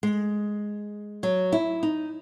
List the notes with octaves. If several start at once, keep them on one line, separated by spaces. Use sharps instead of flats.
G#3
F#3
E4
D#4